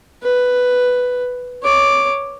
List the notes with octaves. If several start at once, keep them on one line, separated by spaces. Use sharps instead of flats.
B4
C#5 D6